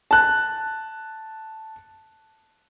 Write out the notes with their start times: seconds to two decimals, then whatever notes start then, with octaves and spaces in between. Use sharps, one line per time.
0.11 A5 F#6